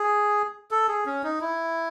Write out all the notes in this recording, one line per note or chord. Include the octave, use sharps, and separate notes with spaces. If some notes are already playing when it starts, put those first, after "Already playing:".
Already playing: G#4
A4
G#4
C#4
D#4
E4